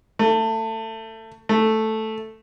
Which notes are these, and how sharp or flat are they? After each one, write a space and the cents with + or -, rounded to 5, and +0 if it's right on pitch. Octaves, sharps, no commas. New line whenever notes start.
A3 +25
A3 +0